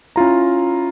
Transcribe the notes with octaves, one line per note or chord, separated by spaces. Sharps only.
C#4 E4 F4 A#5